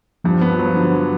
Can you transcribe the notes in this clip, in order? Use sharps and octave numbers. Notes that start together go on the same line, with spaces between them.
G2 F3
B3
F#3
D3